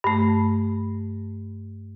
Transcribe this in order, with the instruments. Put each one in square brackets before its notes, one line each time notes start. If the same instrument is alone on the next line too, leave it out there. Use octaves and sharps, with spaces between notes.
[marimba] G2 A3